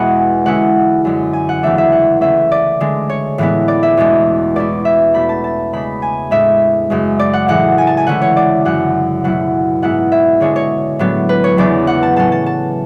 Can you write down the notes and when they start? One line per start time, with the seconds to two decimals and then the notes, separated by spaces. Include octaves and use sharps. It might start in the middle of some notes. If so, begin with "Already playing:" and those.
Already playing: E2 B2 G#3 F#5 G#5 B5
0.45 D3 G#3 C#4 E4 F#5
1.05 F#2 D3 G#3
1.33 G#5
1.49 F#5
1.63 E2 C#3 E3 A3 D4 E5
1.78 E5
1.92 F#5
2.21 D3 A3 C#4 E5
2.52 D5
2.80 D3 G#3 D4
3.10 C#5
3.38 A2 E3 G#3 B3 E4
3.68 D5
3.83 E5
3.97 E2 B2 G#3 D4
4.56 B2 G#3 C#4 E4 D5
4.85 E5
5.14 B2 A3 D4 B5
5.29 A5
5.44 A5
5.73 C#3 G#3 D4 B5
6.02 G#5
6.31 A2 G#3 D4 E5
6.90 F#2 C#3 G#3
7.19 D5
7.33 F#5
7.48 A2 E3 G#3 F#5
7.78 G#5
7.87 A5
7.97 G#5
8.07 D3 A3 C#4 E4 F#5
8.22 C#5
8.37 D5
8.65 F#2 C#3 F#3 F#5
9.24 B2 F#3 A3 E4 F#5
9.82 G#2 G#3 B3 E4 F#5
10.12 E5
10.41 D3 G#3 D4 C#5
10.56 C#5
10.99 A2 F#3 B3 D4
11.29 B4
11.44 C#5
11.57 E2 C#3 F#3 B3 D4 D5
11.87 F#5
12.03 A5
12.16 A2 F#3 C#4 A5
12.32 A5
12.46 A5